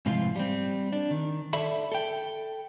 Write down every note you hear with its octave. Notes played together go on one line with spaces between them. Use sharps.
G#2 C3 E3 F3 F4
G3 C4
D4
D#3
A4 D5 E5 B5
A4 G5